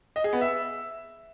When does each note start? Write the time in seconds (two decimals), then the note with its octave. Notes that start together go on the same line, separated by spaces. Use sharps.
0.16 D#5
0.24 G#4
0.33 B3
0.41 E5